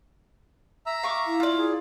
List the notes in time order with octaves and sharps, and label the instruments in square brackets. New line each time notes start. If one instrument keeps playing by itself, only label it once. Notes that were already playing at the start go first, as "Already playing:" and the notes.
[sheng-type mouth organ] E5 A#5 E6
[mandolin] F5 C#6 D6
[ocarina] E4
[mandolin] F4 D5
[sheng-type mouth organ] G#4